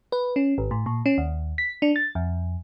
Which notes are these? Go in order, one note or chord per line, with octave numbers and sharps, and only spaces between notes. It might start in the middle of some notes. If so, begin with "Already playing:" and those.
B4
C#4
G#1
A2
A#2
C#4
D#2
B6
D4
A6
F2